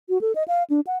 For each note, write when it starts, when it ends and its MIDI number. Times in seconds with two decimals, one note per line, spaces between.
0.09 0.21 66
0.21 0.32 69
0.35 0.43 75
0.48 0.63 77
0.70 0.80 62
0.87 0.97 78